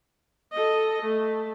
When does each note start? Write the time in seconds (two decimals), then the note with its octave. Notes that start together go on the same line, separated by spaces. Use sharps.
0.52 A4 D#5
1.03 A3